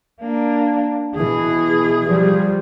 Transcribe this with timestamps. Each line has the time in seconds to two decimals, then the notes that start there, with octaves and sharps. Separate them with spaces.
0.22 A#3 D4
1.16 B2 E3 G#4
2.08 F3 G3